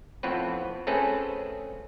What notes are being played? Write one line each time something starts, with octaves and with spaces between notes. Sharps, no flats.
F2 A2 B3 C4 B4
A3 C4 C#4 G#4 A4 B4